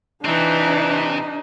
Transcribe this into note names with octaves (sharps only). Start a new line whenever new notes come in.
C3 E3 C4 D4 D#4